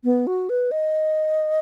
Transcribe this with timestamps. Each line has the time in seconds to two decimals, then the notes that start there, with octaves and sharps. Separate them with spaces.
0.04 B3
0.27 F#4
0.49 B4
0.71 D#5